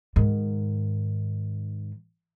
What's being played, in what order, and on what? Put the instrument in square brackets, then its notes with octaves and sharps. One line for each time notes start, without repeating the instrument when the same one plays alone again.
[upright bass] G#2 D#3